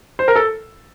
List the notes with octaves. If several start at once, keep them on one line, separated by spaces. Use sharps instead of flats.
C5
A#4
A4